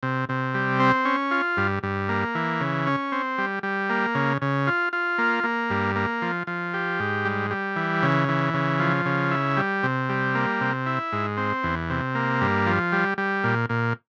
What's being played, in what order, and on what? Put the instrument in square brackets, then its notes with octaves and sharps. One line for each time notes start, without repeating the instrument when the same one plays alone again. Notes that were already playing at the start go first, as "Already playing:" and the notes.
[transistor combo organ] C3
C3
G3
C4
C#4
F4
G2
G2
A#3
E3
C#3
C#4
C4
G3
G3
A#3
C#3
C#3
F4
F4
A#3
A#3
G2
A#3
F3
F3
G4
G#2
G3
G3
E3
C#3
E3
C#3
F3
C#3
E4
G3
C3
G3
A#3
C3
E4
G#2
C4
E2
C3
A#3
G2
F3
G3
G3
A#2
A#2